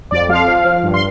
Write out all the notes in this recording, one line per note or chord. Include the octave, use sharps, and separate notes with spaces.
F2 D5
F3 F5
F3
F3
G2
C6